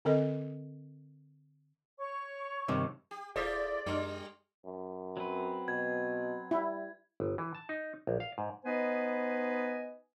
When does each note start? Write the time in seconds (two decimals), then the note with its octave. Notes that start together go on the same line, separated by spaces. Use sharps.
0.05 D3 C4 A4 D#5
1.99 C#5 C#6
2.68 G2 C3 D#3
3.11 G4
3.36 D#1 E4 G#4 A4 C5 D5 D#6 B6
3.86 F#2 G3 D4 G4 C6 F6
4.65 F#2
5.17 F#3 C4 B4
5.68 B2 G#6
6.51 G3 E4
7.20 G1
7.38 E3
7.55 A5
7.69 D#4
8.07 A#1
8.20 F5
8.38 G#2
8.65 B3 D#4 B4 C5 D#5 G#5